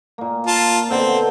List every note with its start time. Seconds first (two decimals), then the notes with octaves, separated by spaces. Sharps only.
0.18 A#2 A#3
0.47 F4 A5
0.90 B2 D3 C4 A4